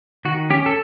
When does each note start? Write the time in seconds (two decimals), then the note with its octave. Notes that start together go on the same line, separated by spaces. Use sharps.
0.25 D#3 F#4
0.50 C#4 G4
0.66 A4